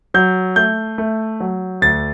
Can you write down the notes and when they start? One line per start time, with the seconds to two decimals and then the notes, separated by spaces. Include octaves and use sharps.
0.14 F#3 G6
0.56 A3 G6
0.98 A3
1.40 F#3
1.82 D2 A6